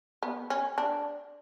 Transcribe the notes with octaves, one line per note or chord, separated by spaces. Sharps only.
B3
C#4
D4